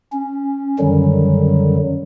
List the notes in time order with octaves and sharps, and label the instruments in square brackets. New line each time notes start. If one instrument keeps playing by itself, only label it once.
[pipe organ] C#4
F#2 D3 D#3 F#3 G3